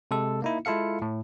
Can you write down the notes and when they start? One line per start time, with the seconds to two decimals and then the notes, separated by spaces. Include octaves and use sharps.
0.11 C3 G#3 A4
0.42 A#3 D#4 E4
0.65 G#3 E4 F4 A4 F5 C#7
1.02 A2